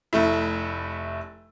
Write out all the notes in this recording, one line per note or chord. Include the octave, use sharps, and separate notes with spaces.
F1 A3 E4